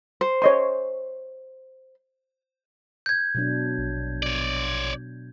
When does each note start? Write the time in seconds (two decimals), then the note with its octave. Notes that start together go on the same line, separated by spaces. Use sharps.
0.21 C5
0.42 C#5 D#5 C6
3.06 G6 G#6
3.35 B2 F#3 D4
3.78 A#1
4.23 C#5 D5